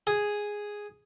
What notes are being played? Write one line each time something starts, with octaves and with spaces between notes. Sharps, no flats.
G#4